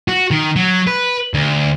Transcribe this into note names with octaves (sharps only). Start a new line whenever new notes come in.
F#4
D#3
F#3
B4
D2